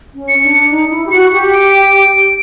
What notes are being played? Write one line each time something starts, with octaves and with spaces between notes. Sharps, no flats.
C#4
C#7
D4
D#4
E4
G4
F#4 C#7
G4
D7